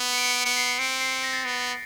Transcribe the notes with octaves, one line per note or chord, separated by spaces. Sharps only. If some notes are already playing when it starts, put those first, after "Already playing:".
Already playing: B3
C#7
D7
C#7
D7
B3 C#7
C7
C#7
C4 D7
C7
C#7
A#6
A6
B3